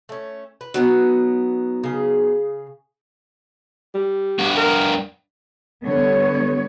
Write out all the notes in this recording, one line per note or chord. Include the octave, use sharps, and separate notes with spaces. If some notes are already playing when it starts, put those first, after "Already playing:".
A3 C#4
B4
F#3 B3 D#4
C#3 G#4
G3
G2 F#4
A#4
D3 G3 B3 C#5